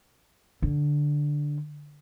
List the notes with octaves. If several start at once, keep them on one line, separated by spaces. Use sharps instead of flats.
D3